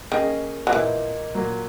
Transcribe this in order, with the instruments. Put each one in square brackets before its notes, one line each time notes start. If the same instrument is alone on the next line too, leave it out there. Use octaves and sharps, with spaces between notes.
[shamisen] D#3 [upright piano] A#3 C#4 G#4 D#5
[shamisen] F#3
[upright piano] A#2 A#3 D#4 [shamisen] E3
[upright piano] A#2 F#3 A#3